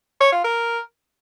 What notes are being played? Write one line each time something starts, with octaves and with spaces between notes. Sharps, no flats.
C#5
F4
A#4